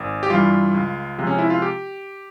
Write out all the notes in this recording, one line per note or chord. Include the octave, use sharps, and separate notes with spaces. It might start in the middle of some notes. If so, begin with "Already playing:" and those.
Already playing: G#1
G4
G2 E3 G3 F4
C#2
C3 F3 G#3
C#4
E4
F4
G4